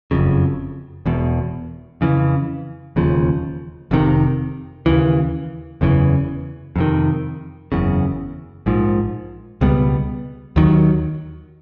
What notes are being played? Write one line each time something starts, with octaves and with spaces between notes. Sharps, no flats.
F#1 F2 C#3
E1 E2 B2
F2 C#3 E3
E1 D#2 C#3 F3
F1 F2 C3 D#3
D#2 C#3 E3
F#1 E2 C#3 E3
F2 C3 D#3
F#1 E2 C#3
A#1 G#2 F3
C#2 B2 G3 B3
D#2 D#3 F#3